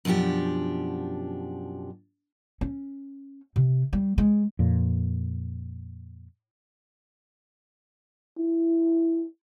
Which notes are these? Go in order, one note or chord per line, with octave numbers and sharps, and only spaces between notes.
F#2 B2 F3 D4 G4
C#4
C3
G3
G#3
F2 A#2
E4